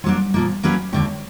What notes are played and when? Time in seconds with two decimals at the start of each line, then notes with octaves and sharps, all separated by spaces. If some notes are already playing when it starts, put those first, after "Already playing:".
0.04 F#3 G3 A#3 D4
0.34 A#2 F3 A#3
0.63 F#3 A#3 C#4 F#4 B4
0.93 D#2 D3 F3 G#3